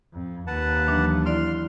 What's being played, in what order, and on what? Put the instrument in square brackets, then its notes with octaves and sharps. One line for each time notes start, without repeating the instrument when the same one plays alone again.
[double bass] F2
[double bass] D#2 [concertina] B4 F#5 A5
[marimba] E3 F#3 D4
[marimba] E4 D5 [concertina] C6 F6